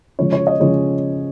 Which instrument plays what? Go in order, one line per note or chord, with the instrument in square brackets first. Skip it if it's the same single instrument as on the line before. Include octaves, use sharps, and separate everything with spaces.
[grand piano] C#3 F3 G#3 C#5
C#5
D#5
C#3 F3 G#3 C#5